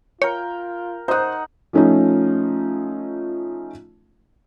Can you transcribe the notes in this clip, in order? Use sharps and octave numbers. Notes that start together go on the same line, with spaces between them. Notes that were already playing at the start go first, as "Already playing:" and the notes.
F4 A#4 C#5 G5
D#4 C5 F#5 D#6
F3 A3 C#4 D#4 F4